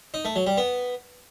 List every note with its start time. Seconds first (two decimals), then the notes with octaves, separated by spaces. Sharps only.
0.14 D#4
0.25 A3
0.36 F#3
0.46 G3
0.57 B3